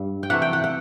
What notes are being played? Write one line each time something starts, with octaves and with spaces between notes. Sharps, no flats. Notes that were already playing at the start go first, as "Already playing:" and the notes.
Already playing: G2 G3
G5
C3 E3 A3 F#5
G5
F#5
F#5